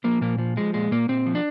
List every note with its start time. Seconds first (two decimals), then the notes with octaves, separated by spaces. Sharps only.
0.04 F3 A#3
0.21 A#2 A#3
0.38 F3
0.57 F3 G#3
0.74 A#2 G#3
0.91 A#2 A#3
1.09 A#2 C4
1.26 F3
1.35 D4